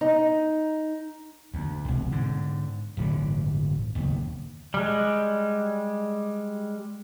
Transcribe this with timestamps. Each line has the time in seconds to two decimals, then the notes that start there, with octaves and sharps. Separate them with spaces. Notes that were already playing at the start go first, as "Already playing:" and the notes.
0.01 D#4
1.54 D2
1.85 E1 C2
2.12 G#2 D3
2.97 D1 G1 D3 E3
3.95 F#1 D#2
4.74 G3 G#3